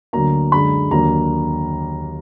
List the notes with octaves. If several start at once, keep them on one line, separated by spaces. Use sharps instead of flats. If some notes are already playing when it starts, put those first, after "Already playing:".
D2 D3 F#3 A#3 A#5
F#2 D3 G#3 B5
D#2 D3 F#3 A#3 A#5